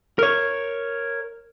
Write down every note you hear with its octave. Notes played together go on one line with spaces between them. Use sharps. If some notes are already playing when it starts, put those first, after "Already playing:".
A#4 C#5